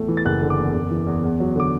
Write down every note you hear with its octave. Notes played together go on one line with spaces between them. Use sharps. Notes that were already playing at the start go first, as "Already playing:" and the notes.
Already playing: E2 A2 A3
E3
A6
F#1 F#6
D3
D6
E2
F#1
E3
E2
E2
F#3
D3 D6